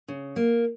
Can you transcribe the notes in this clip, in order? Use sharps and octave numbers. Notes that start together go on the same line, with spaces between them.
C#3
A#3